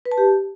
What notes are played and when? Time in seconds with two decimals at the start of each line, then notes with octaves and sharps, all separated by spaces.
0.05 B4
0.12 A5
0.18 G4